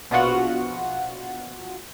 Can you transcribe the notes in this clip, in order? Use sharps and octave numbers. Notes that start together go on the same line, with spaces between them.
A#1 B2 B3 F4 F#4 F#5